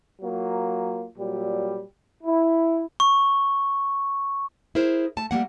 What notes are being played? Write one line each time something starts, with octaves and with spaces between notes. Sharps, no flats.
F#3 A#3 F4
A#2 F#3 G3
E4
C#6
E4 G#4 A#4 C5
A3 A5
G3 A3 A#3 F#5